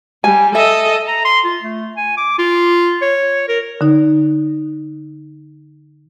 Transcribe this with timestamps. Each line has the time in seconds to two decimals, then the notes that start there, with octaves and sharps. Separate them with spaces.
0.24 G3 G#5
0.55 A4 D#5 E5
1.08 A#5
1.25 C6
1.45 F4
1.62 A3
1.97 G#5
2.18 D6
2.39 F4
3.02 C#5
3.48 A#4
3.81 D3 D#4